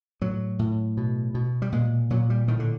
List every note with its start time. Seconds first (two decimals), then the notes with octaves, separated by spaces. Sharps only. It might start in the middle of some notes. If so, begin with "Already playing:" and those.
0.21 A2 F#3
0.59 A2
0.97 B2
1.34 B2
1.62 G3
1.72 A#2 G#3
2.10 A#2 F#3
2.30 G3
2.48 A2 D#3
2.60 D3